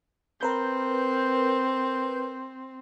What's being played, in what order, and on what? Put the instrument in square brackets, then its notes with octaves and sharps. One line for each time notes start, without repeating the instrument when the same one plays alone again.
[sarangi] C4 [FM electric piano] A#4 B4 G6